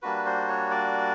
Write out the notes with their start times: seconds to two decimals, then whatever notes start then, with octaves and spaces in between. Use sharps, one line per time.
0.02 G3 A#3 D4 F#4 B4
0.26 C5
0.48 C#5
0.71 D5